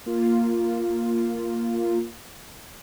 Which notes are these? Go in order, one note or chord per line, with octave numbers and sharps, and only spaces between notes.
A#3 F4